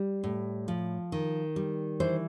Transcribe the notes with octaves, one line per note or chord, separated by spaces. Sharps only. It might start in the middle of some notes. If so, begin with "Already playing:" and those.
Already playing: G3
A2
F3
D#3
G3
E3 C5